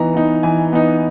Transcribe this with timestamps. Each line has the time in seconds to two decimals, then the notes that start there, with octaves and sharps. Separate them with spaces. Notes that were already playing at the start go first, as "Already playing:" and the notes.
Already playing: E3 B3 D#4 A#5
0.14 B3 D#4
0.43 E3 G#5
0.73 B3 D#4